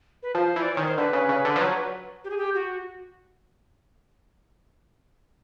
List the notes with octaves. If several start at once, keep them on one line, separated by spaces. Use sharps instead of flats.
B4
F3 C5
E3 D5
D#3 C#5
C5
D3 B4
C#3
C#3
D3
F3
F#3
G4
G#4
G4
F#4